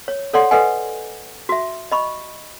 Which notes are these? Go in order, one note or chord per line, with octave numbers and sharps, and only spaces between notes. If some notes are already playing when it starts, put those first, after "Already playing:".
C#5
A4 C#5 D5 F#5 C6
A4 B4 D#5 F#5 G#5
F#4 E5
D#5 B5 C#6